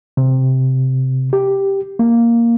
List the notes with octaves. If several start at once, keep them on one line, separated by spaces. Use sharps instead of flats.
C3
G4
A#3